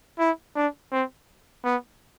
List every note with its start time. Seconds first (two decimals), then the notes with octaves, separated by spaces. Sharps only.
0.20 E4
0.56 D4
0.92 C4
1.65 B3